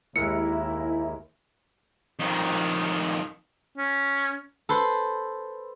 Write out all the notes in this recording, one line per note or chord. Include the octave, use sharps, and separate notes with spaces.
D#2 G#3 E4 A#4 E5 C#7
F2 D#3
C#4
A4 B4 C5